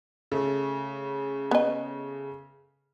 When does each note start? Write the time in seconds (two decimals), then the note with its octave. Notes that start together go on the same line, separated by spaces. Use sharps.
0.32 C#3 A3
1.51 B3 D#5